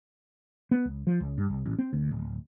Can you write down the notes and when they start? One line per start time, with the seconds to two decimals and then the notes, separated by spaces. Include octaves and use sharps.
0.71 B3
0.85 C#2
1.07 F3
1.21 C#2
1.38 G2
1.50 C2
1.66 A1
1.79 C4
1.93 D2
2.11 D1